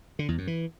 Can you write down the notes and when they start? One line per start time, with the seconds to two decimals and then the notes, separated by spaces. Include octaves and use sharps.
0.19 D3
0.28 E2
0.38 F#2
0.47 E3